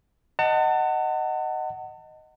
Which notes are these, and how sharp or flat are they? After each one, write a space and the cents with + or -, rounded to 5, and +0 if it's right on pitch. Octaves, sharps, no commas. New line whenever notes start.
D#5 +0 F#5 +15 A5 +35